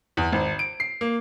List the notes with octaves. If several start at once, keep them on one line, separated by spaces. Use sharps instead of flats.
E2
G#1
D7
C7
A#3